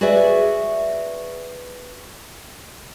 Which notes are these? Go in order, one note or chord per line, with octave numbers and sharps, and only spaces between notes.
F#4 G#4 B4 D5 E5